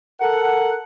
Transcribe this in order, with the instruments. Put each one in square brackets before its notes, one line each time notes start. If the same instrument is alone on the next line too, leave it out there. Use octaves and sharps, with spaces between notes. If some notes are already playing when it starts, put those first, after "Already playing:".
[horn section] A4 A#4 F#5